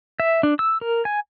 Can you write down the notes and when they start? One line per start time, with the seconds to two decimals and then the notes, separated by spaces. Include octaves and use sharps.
0.20 E5
0.43 D4
0.59 E6
0.81 A#4
1.05 G#5